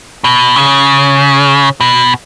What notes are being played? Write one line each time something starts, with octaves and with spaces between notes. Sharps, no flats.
B2
C#3
B2